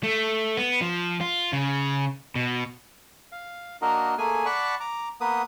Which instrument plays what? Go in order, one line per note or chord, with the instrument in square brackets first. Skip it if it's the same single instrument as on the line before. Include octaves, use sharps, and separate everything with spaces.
[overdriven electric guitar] A3
B3
F3
F4
C#3
B2
[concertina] F5
A#3 D4 F#4 A#4 D#5
A3 A#3 G#4 G#5
D5 F#5 A5 B5 C#6
A#5 D6
A#3 B3 B4 D#6